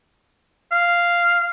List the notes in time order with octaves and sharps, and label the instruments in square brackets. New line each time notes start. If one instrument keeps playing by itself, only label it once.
[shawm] F5